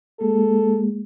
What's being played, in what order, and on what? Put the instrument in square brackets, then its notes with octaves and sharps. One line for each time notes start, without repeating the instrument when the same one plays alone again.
[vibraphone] G#3 A#3 G#4 [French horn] A4